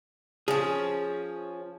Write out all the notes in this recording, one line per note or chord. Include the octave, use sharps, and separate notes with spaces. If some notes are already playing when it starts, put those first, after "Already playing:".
F3 C#4 G#4